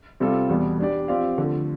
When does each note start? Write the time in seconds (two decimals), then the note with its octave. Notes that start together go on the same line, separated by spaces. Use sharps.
0.20 C3 G3 C4 F4 A4
0.49 E2 B2 G3 B3
0.79 G3 D4 G4 D5
1.08 F3 C4 G4 D5 F5
1.38 D3 F3 A3